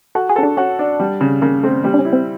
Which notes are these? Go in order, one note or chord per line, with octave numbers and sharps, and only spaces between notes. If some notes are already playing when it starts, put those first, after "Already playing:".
F#4 A4
G#4
C#4 A4
D4
C#4 F#4
D4
G3
C#3
C#3 A#3
A3 C4
G3 A#3
D4
C#4
E4
C4